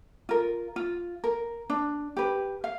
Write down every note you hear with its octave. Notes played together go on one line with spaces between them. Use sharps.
F4 A#4
F4
A#4
D4
G4 B4
F5